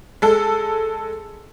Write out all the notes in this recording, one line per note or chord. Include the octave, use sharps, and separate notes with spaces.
G#3 A4